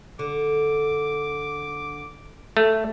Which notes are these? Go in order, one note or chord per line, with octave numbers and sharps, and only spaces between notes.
D3 D6
A3